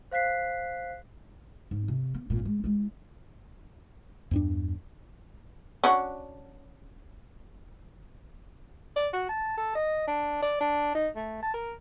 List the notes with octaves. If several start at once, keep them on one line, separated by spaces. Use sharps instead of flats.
C5 F5 F#6 B6 C7
G#2
C3
B3
G#1 A#2
G#3
G#3 E4
E2 G2 D4
C#4 D4 F#4
D5
F#4
A5
A4
D#5
D4
D5
D4
D#4
A3
A5
A#4